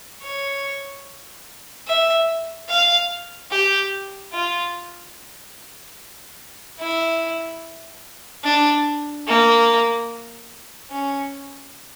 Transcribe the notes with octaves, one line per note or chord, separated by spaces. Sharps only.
C#5
E5
F5
G4
F4
E4
D4
A#3
C#4